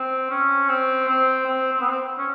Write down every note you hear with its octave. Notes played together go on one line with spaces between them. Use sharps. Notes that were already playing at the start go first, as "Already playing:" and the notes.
Already playing: C4
C#4
C4
C4
C4
C4
B3
C4
C#4